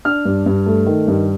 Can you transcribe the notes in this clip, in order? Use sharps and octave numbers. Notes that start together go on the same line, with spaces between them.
D4 F6
G2
G2
A3
D#3
G2